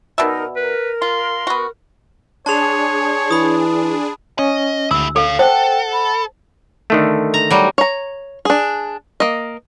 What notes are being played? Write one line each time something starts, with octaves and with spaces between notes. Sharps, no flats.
B2 D#4 A#4 D5 E5
A#4 B4
F4 C6
B3 F#4
D4 G#4 C#5 A5 C6 F7
E3 B5 D#6
C#4 D#5
D2 E4 G#4 E6
A4 C#5 F5
A4 C5 F#5 G5
B5
D3 D#3 A3
A#5
F#3 G3
C#5 A#5
D4 G#4
A#3 D#5